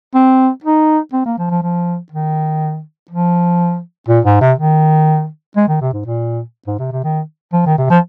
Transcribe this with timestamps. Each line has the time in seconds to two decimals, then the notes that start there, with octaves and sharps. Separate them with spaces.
0.15 C4
0.64 D#4
1.13 C4
1.26 A#3
1.38 F3
1.50 F3
1.62 F3
2.12 D#3
3.11 F3
4.09 A#2
4.25 G#2
4.41 C3
4.58 D#3
5.57 G#3
5.68 D#3
5.82 C3
5.93 G#2
6.06 A#2
6.67 G#2
6.79 C3
6.92 C3
7.04 D#3
7.53 F3
7.66 D#3
7.78 C3
7.90 F3